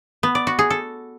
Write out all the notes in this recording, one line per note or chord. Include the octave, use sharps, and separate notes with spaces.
B3
D5
F#4
G#4
A4